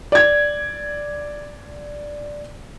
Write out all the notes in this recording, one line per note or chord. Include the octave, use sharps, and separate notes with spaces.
D5 G#6